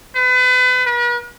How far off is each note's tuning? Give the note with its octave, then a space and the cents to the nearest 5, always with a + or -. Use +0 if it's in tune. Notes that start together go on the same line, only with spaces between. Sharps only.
B4 +35
B4 -45